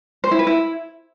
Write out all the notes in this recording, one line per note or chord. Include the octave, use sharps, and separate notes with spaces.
C5
E4
B4
E4